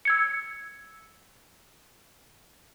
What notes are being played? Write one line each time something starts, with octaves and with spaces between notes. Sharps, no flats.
E6 G#6 C#7